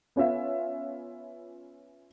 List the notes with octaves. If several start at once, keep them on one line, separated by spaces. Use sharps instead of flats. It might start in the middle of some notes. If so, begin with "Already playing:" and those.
B3 C#4 F4 E5